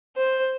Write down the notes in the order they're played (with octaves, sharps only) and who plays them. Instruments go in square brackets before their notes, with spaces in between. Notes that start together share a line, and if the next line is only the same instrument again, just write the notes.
[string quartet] C5